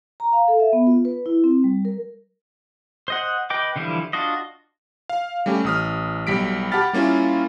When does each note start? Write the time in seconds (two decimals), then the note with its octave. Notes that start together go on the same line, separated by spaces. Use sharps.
0.20 A#5
0.33 F5
0.48 A4
0.60 E5
0.73 B3
0.87 F4
1.05 B4
1.26 E4
1.44 C4
1.64 G3
1.85 A#4
3.08 C5 D#5 F#5
3.50 B4 D#5 G5 D6
3.76 D3 E3 F3 G3 E4
4.13 D4 F4 F#4 D#5
5.09 F5
5.46 G3 A3 C#4 G4
5.65 A1 D#6 F6
6.27 B1 G3 B6 D7
6.72 G4 F#5 A5 B5 F6 A6
6.93 G3 A#3 C#4 E4 F4